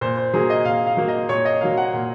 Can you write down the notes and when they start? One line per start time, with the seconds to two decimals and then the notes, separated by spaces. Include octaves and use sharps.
0.01 A#2 C5
0.17 C5
0.33 F#3 A#3 G#4
0.50 D#5
0.65 A#2 F5
0.86 F5
0.97 F#3 A#3
1.08 D#5
1.29 A#2 C#5
1.45 D#5
1.61 F#3 A#3 F5
1.77 F#5
1.93 A#2